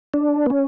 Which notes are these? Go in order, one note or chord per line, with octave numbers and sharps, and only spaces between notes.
D4
B3
C#4